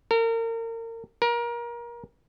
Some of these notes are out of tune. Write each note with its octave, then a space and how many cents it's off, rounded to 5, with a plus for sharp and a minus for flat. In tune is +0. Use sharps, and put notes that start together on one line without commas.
A#4 -35
A#4 +25